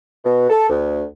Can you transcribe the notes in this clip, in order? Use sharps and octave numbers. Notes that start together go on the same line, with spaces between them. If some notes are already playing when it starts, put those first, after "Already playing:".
B2
A4
D2